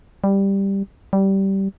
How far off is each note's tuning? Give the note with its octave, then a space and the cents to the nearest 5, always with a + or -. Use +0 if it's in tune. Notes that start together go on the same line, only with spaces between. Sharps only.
G3 +5
G3 -15